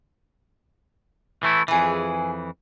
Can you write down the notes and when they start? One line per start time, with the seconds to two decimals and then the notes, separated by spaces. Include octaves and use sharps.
1.43 E3 A3 E4
1.68 F2 E3 G#4 B4